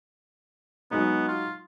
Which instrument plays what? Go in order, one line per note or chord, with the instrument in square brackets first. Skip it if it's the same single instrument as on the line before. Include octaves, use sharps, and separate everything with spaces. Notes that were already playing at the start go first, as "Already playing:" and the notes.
[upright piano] F#3 G#3 D#4 [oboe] B3
[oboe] F4